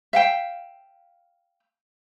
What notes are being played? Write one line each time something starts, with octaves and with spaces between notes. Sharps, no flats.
E5 F5 G5